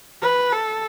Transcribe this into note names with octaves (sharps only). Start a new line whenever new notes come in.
B4
A4